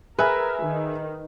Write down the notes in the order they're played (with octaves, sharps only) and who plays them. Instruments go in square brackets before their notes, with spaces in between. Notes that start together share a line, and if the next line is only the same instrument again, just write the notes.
[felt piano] G#4 E5 G#5 [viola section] A#4 [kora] B4
[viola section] D#3